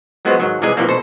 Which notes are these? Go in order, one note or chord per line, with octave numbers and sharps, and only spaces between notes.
F3 F#3 G#3 B3 F#4 C5
G#2 D#3 F#3
C3 E3 G3 G#3 G#4 G#5
B2 E3 F3 G3 A#3 C4
B2 A4 C5